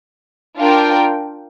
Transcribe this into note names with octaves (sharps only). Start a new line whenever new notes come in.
D4 F4 A#4 G5